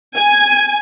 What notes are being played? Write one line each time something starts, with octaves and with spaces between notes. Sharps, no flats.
G#5